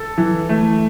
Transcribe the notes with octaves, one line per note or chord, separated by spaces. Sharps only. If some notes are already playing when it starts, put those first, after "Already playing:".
Already playing: A4
E3
A3